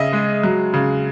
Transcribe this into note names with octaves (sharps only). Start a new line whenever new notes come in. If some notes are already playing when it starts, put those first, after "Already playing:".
Already playing: C#3 D#5 E5
G#3
F#3
C#3